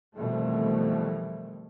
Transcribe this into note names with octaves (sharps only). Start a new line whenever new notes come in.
F2 B2 D#3 E3 G3 A3